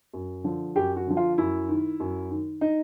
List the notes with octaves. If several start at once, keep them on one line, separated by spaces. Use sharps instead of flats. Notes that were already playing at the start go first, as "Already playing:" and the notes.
F#2
D3 F3
F#2 G4
F#4
D3 F3
F4
F#2 E4
D#3
F#2
D#3
D#4